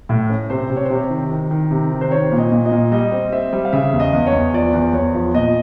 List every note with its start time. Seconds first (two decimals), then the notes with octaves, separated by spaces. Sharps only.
0.09 A2
0.30 C#4
0.50 C3 C5
0.70 C3
0.76 C#5
0.85 C5
0.90 C3 C#5
1.10 D#3
1.31 D#3
1.51 D#3
1.71 C3
1.91 D#3
2.01 C5
2.11 C4 C#5
2.32 A#2
2.38 D#5
2.52 A#2
2.65 D#5
2.72 A#2
2.92 G3 D#5
3.12 C4
3.32 C4 E5
3.53 G3
3.65 F5
3.73 C#3 E5
3.93 E2
4.00 D#5
4.13 E2
4.27 C#5
4.33 E2
4.54 F3 D5
4.74 E2
4.94 E2 C#5
5.14 F3
5.34 A#2 D#5